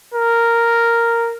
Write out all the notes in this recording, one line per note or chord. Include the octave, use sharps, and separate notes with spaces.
A#4